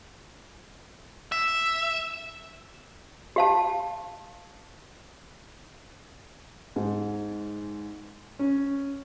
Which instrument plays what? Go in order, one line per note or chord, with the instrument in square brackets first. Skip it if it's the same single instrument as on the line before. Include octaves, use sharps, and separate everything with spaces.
[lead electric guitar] E5
[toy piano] G4 F5 A5
[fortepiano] G#2
C#4